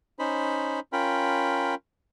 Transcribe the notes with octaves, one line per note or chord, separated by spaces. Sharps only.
C#4 D#4 C5 B5
C#4 F4 A#4 G5 B5